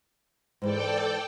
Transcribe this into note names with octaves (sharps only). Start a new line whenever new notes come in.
G#2 E3 G#3 A4 D5 G5